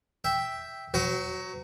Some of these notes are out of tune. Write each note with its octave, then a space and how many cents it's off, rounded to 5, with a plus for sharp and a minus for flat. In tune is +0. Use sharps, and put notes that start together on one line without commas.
E5 +0 G5 +0
F#3 +0 F#4 +25 C5 -45